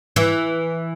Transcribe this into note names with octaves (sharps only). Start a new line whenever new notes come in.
E3